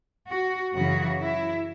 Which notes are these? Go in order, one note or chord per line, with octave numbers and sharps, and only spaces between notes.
F#4
F#2 C#3 E3 F#4
E4